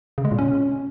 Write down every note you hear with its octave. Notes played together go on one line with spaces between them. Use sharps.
C#3
G#3
A#2
C#4